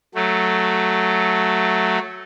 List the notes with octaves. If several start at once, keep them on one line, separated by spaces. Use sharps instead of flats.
F#3 A3